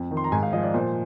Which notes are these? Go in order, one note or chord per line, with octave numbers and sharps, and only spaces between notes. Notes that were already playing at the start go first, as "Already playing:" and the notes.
Already playing: F2
D#3
C6
A#5
G#2 G#5
F5
F3 D#5
D5
A#2 C5